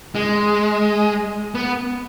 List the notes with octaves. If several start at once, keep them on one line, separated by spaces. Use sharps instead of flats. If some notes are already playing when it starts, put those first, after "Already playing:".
G#3
B3